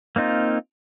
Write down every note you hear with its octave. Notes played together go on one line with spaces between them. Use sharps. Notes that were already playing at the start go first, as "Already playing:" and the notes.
A#3 C4 D#4 F4